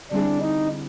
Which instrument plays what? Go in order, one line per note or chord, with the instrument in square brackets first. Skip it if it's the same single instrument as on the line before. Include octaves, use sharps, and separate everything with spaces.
[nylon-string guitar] D3 G3 C4 E4 G#4 [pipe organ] D4
[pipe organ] D#4